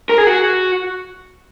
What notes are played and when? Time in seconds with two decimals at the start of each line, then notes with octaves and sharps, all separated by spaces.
0.09 A#4
0.18 G#4
0.27 F#4